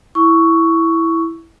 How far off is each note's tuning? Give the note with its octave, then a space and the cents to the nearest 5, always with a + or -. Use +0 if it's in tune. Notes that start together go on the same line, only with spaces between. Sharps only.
E4 +0 C#6 +10 E6 +5